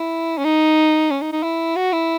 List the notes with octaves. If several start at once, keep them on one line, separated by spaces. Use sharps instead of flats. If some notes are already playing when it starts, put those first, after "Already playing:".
Already playing: E4
C#4
D#4
C#4
D#4
D#4
E4
F#4
E4